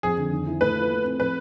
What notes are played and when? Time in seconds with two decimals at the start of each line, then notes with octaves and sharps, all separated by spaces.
0.03 F2 G#4
0.17 D3
0.32 D#3
0.47 E4
0.60 A3 B4
0.75 F4
0.91 A3
1.04 C4
1.20 F3 B4